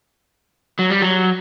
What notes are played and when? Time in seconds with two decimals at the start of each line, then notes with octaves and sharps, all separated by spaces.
0.79 F#3
0.90 G3
1.02 F#3